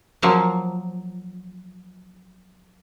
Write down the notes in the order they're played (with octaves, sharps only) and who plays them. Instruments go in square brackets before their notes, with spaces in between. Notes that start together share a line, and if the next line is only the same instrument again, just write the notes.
[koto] F3 F#3 A#3